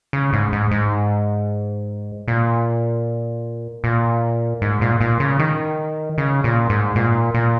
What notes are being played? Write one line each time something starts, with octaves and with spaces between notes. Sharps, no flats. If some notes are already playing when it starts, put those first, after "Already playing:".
C#3
G#2
G#2
G#2
A#2
A#2
G#2
A#2
A#2
C#3
D#3
C#3
A#2
G#2
A#2
A#2